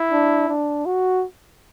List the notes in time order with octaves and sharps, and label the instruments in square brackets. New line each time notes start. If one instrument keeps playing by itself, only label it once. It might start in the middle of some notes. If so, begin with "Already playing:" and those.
Already playing: [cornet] E4
[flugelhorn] D4
D4
F#4